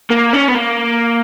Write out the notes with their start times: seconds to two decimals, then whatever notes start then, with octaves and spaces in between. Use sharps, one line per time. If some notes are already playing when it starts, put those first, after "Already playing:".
0.11 A#3
0.34 C#4
0.49 B3
0.56 A#3